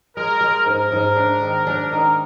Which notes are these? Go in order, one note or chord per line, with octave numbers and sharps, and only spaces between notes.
G#3 A#4
G#3
G#2 A#4
G#2
D4
D#3
D4
D#3